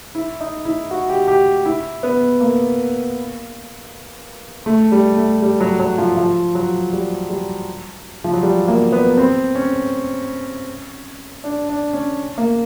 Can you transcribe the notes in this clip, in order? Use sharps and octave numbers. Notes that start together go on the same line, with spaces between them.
E4
D#4
E4
F#4
G4
G4
E4
B3
A#3
A3
G3
A3
G3
F#3
F#3
F3
F3
F#3
G3
G3
F3
F#3
G3
A#3
B3
C4
C#4
D4
D4
C#4
A#3